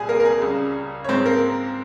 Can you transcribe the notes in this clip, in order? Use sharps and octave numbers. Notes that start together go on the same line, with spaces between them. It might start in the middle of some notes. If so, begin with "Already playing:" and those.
Already playing: C2 A#2 G3 G#4 G#5
A#3 A#4
A#4
G#4
C#2 C#3 G3
C#5
G#2 F3 G#3 C4 C5
A#3 A#4